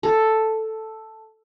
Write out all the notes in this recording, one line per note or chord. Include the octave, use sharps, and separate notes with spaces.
A4